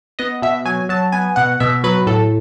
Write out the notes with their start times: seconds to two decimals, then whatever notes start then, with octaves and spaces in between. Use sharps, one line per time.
0.19 B3 D#5
0.42 B2 E5
0.65 F#3 G#5
0.89 F#3 A5
1.12 B3 G#5
1.36 B2 F#5
1.60 B2 E5
1.84 F#3 B4
2.07 A2 A4